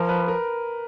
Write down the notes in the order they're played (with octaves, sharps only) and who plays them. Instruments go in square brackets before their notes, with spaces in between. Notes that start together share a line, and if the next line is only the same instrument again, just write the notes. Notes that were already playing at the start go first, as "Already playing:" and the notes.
Already playing: [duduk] F3 [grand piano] A#4
[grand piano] B4
A#4